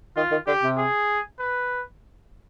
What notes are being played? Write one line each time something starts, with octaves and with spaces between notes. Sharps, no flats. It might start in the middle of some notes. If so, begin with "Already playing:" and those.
D#3 F4
D#3
D3 G4
C3
G#4
B4